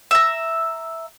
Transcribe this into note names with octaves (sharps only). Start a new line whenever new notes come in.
E5 A#5